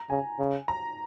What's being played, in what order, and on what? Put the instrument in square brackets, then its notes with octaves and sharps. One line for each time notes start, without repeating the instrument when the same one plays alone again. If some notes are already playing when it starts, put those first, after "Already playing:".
Already playing: [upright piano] A#5
[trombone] C#3 [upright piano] G#5
[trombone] C#3
[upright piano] A#5